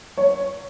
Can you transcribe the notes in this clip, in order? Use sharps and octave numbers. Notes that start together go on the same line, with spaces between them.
C#5